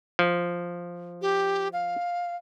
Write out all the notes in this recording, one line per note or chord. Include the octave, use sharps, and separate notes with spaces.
F3
G4
F5